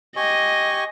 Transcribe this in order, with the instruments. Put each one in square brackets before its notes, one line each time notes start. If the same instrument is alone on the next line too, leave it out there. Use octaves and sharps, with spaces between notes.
[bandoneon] G4 G#5 C#6 [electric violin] D#5